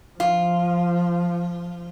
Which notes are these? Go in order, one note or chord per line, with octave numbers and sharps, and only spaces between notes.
F3 F4